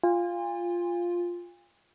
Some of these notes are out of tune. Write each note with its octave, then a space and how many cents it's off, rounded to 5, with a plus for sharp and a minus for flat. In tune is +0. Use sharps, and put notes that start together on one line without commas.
F4 +0 G#5 -40